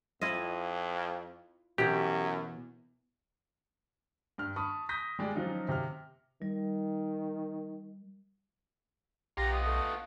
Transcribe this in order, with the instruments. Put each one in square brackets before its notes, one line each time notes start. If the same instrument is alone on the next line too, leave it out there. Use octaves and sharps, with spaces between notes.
[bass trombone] F2 [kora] E4 F4 D#5
[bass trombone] F#2 [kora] B2 E3 [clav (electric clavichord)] G4
[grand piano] G2 F6
A5 B5 C#6 D#6
D#6 G6 A#6 B6
G3 G#3 D5
F3 F#3 C#4 D#4 F4
C3 F6
[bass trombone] D#3 [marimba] G3
[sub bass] B1 [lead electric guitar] B3 F4 [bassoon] G4 [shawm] A#5
[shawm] D#5
[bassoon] A3